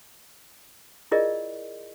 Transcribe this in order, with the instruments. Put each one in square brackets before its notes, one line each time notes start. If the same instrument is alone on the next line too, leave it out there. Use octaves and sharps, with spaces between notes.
[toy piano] E4 F4 G#4 A#4 D5 D#5